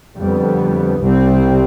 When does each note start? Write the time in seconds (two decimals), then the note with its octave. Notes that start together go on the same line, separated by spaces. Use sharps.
0.17 F2 D3 G3 B3
0.99 C2 C3 G3 C4